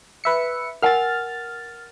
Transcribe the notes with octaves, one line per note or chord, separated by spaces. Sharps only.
B4 E5 C#7
A#4 F#5 G#5 F6 A6